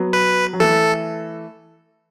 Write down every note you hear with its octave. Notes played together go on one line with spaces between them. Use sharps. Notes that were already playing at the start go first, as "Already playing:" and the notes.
Already playing: F#3 B3
B4
F#3
E3 A3 A4